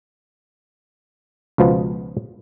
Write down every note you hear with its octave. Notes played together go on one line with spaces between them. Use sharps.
C#2 B2 F3 B3